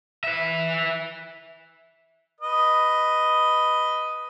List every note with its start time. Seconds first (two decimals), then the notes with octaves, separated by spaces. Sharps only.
0.24 B4 E5
2.41 B4 D#5